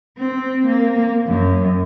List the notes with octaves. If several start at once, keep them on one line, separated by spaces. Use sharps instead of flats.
C4
A#3
F#2